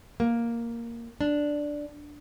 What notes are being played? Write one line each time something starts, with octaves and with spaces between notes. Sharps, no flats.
A#3
D4